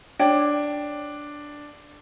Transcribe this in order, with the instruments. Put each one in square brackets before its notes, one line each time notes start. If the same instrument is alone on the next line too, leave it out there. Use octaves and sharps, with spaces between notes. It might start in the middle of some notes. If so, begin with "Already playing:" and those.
[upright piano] D4 [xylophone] C#5 G5